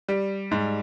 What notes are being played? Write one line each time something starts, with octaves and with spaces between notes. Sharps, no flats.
G3
G#2